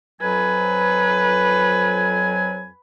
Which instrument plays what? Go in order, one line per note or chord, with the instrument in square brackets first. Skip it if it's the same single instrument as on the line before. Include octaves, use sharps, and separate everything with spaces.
[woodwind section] F2 F#3 G#5 [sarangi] B4